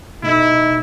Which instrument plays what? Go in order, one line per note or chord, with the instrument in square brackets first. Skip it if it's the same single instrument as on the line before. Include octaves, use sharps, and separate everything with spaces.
[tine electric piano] B2 A3 [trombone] D#4 [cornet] E4